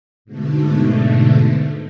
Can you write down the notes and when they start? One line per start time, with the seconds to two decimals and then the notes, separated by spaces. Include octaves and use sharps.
0.25 G#2 B2 D3 A3